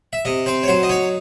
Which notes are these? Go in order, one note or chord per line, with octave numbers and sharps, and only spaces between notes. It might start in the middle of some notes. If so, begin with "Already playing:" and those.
E5
C3 D#5
C4 C5
C#5
F#3 C5
D#5
D#4 C#5